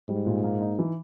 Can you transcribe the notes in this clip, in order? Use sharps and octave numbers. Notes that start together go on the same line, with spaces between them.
G#2 G3
A#2
A#3
D#4
E3